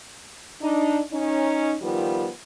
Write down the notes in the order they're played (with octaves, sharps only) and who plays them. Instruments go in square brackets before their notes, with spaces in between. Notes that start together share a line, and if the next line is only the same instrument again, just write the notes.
[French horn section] D4 D#4
C#4 D#4
D#3 F3 G3 B3 F4